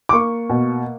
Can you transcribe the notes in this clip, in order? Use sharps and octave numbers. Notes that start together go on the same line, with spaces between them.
D6
A#3 C#6
B2